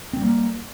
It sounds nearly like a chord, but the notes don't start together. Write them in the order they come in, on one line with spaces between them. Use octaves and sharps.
C4 G3 A#3